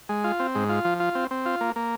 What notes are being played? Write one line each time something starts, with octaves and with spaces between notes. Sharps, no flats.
G#3
F4
C4
G#2
F4
F3
F4
C4
C4
F4
A#3
A#3